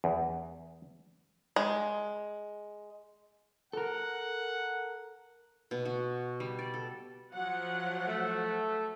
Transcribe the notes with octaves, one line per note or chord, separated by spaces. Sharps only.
E2
G#3
A4 A#4 F#5
B2
F#4
G3
D5
A4
F3 F#3 F#5
A3